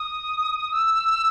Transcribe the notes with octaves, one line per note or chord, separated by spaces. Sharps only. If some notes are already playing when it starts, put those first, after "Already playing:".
Already playing: D#6
E6